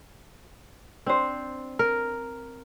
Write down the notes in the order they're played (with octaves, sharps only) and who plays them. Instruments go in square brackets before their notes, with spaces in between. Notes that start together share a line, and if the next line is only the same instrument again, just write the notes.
[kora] C4 [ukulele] D4 C5
[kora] A#4